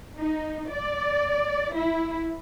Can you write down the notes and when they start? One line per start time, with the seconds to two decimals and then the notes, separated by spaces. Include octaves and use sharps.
0.17 D#4
0.70 D5
1.75 E4